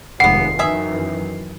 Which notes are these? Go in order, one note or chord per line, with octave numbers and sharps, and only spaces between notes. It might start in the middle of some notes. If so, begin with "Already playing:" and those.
F1 D#2 E3 G#3 B3 F#5 C7
F#2 D#3 E3 G#4 E5